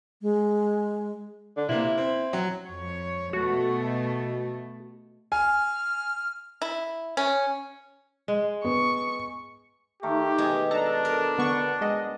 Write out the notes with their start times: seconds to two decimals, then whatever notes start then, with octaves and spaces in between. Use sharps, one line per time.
0.22 G#3
1.57 D3
1.69 C3 A#3 E4
1.98 C4
2.33 F#3
2.66 F2 C#5
3.33 B2 A3 F#4
5.32 G#5 F6
6.62 E4
7.17 C#4
8.28 G#3
8.65 B3 C#6
10.03 D#3 A3 G4 A#4
10.38 B2 G#3 G#4
10.71 D4 A4 A5 A#5
11.05 A#4
11.38 D3 B3 C#6
11.81 G#3 D#5 F#5